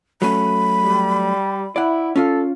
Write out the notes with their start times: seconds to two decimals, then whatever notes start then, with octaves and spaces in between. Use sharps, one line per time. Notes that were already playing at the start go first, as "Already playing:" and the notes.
0.22 F#3 A3 C#4 B5
0.84 G3
1.76 E4 D5 F#5
2.16 C#4 F4 A4 F5